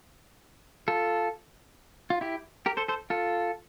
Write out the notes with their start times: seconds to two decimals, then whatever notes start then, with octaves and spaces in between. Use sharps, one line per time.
0.88 F4 A4
2.10 F4
2.21 E4 G4
2.66 G4 A#4
2.77 A4 C5
2.88 A4 C5
3.10 F4 A4